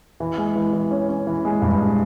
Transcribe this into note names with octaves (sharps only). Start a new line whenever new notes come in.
E3
G#3
E3
E3
C#4
C#4
E3
G#3
G2
G#3